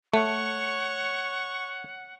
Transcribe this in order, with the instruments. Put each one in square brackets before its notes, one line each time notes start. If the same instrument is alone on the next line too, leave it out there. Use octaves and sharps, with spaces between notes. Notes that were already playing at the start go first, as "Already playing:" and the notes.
[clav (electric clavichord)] A3 [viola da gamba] C#5 [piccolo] F#5 [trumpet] C#6